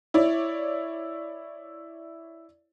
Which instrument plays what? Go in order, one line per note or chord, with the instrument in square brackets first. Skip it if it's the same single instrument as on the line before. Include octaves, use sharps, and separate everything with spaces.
[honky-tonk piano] E4 C#5 D5